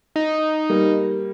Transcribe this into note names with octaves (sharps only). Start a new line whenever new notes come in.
D#4
G3 A#3